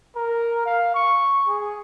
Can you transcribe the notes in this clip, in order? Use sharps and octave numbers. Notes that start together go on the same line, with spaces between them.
A#4
F5
C#6
G#4